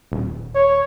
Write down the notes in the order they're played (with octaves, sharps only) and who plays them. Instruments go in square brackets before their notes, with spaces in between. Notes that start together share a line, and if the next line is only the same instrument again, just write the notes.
[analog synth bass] D#1
[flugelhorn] C#5